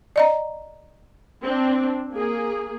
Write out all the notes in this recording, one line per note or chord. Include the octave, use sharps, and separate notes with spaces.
D5 D#5 A#5
C4 D4
A#3 G#4